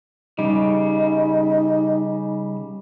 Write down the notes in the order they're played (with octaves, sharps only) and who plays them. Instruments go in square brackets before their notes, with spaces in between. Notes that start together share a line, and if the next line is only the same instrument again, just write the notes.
[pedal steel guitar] C#3 G3 [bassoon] D#4